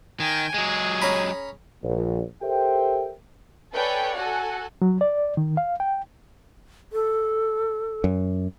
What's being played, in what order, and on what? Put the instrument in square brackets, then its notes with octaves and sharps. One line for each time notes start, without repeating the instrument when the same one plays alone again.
[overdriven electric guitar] D#3 [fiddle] G5 G#5
[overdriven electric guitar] F#3 G#3 [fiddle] G#4
[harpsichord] C#4 A#5 B5
[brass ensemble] A#1
G4 A4 A#4 C5 E5 G5
[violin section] A4 B4 C#5 D5 G5 G#5
F#4 A4 F#5 G#5
[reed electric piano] F#3
D5
D#3
F5
G5
[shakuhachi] A4
[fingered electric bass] F#2